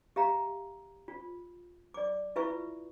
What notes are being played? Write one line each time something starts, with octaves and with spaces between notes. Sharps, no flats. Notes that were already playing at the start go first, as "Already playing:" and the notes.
G4 E5 F5 A#5
F4
D5 D6
E4 F4 B4 E5 C#6